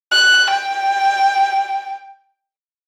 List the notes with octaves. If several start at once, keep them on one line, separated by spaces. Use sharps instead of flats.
F#6
G5